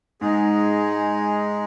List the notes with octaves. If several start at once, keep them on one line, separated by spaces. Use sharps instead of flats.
G#2 G#3 D#4 G#4